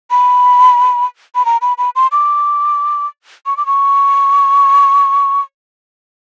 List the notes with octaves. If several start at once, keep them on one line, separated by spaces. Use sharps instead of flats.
B5
B5
A#5
B5
B5
C6
D6
C#6
D6
C#6